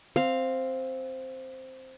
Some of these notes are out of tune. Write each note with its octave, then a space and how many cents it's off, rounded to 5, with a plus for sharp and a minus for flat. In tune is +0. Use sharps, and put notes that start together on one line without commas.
C4 +0 F5 +0